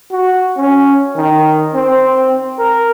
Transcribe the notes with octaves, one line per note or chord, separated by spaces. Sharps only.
F#4
C#4
D#3
C4
A#4